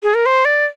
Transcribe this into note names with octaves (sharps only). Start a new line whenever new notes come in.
G#4
A#4
C5
D5